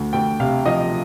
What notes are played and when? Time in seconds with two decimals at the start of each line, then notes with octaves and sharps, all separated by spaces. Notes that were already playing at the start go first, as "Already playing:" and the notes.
Already playing: D2
0.13 D2 G5
0.40 C3 F5
0.66 F3 D#5